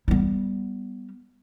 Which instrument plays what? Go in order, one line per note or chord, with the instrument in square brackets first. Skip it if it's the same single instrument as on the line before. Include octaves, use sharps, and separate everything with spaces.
[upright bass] G3 B3